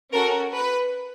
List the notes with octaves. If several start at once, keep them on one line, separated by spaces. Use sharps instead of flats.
C#4 F#4 A4 A#4
B4